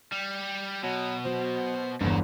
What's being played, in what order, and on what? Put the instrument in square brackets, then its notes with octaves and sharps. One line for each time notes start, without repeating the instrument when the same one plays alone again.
[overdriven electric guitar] G3
[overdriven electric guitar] B2 [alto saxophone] F#3
[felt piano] F#3 [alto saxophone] C5
[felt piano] G1 E2 [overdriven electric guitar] G#2